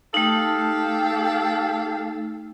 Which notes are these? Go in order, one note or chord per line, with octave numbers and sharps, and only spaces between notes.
A3 D#4 G4 A4 F5